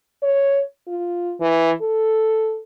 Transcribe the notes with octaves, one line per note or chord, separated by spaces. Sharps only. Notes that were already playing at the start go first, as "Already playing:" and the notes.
C#5
F4
E3
A4